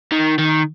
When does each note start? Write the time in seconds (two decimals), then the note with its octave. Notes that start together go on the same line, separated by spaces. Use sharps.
0.12 D#3
0.38 D#3